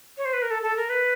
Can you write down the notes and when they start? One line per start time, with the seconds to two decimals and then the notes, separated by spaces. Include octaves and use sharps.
0.18 C#5
0.25 C5
0.33 B4
0.42 A#4
0.51 A4
0.63 A4
0.77 A#4
0.89 B4